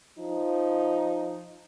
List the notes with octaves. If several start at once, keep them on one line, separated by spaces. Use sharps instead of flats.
F3 D#4